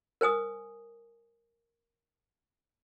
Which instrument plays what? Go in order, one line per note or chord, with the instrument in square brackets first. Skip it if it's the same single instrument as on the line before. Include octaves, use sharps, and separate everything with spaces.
[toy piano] A#4 C5 G#5 D#6